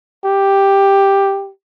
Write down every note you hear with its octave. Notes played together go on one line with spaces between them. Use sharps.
G4